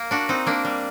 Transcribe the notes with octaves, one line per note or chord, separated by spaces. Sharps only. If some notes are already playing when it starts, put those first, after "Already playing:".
Already playing: A#3
D4 F#4
C4 D#4
A#3 D4
G3